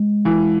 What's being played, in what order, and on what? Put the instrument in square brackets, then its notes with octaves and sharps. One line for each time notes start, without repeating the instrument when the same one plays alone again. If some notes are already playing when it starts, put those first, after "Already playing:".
Already playing: [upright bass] G#3
[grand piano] E3